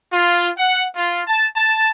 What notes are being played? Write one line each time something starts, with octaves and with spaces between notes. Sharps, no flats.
F4
F#5
F4
A5
A5